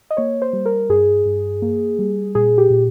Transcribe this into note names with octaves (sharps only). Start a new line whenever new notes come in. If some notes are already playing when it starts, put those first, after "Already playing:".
D#5
A#3 C#5
C5
G3
A#4
G2 G#4
G2
A#3
G3
A#2 G#4
G4
A#2